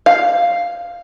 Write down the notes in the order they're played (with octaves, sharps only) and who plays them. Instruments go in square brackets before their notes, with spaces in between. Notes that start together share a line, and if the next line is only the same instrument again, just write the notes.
[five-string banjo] F5